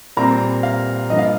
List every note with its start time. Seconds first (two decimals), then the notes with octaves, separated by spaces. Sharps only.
0.17 A#2 G3 C4 A#5
0.63 F5
1.10 G2 F3 A#3 D#5
1.19 F5